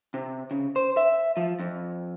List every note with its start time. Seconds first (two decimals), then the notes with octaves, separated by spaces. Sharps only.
0.14 C3
0.51 C#3
0.76 C5
0.97 E5
1.37 F3
1.60 F2